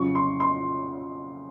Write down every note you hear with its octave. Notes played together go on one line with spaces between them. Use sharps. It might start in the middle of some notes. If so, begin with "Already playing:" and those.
Already playing: F2 C#3 F#3 C#6
C6
C6